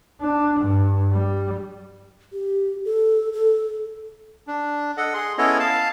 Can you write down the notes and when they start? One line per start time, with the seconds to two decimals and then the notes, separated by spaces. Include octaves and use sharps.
0.21 D4
0.60 G2
1.12 G3
2.33 G4
2.85 A4
3.33 A4
4.47 D4
4.97 A4 D#5 F#5
5.14 G#4 C6
5.38 B3 C#4 E4 A4 C#5 D#5
5.59 F5 A5